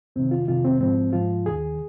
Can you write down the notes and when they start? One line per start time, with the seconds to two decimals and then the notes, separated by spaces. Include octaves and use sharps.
0.16 F2 C3 D#3 C4
0.31 F4
0.47 F2 C3 D#3 F4
0.64 C4
0.80 G#2 F3 C4
1.13 G#2 F3 F4
1.46 D#2 D#3 G#4